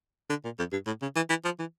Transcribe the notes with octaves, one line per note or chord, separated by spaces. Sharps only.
D3
A#2
F2
G2
A2
C#3
E3
E3
F3
E3